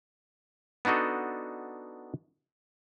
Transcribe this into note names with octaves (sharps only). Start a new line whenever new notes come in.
B3 D4 D#4 F#4 A4